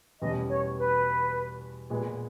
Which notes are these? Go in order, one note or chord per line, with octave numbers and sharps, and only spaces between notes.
E2 B2 G3 C#4 D#5
C#5
B4
A#2 G#3 B3